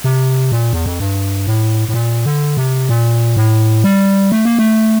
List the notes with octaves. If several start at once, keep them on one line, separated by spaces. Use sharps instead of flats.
C3
A#2
E2
F2
G2
A2
A2
A#2
D3
C3
A#2
A2
G3
A3
A#3
A3